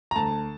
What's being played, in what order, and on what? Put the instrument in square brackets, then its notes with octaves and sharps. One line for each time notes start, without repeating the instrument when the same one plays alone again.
[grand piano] A#5
D2 A5